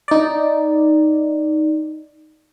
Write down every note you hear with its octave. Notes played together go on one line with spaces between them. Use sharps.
D#4 D5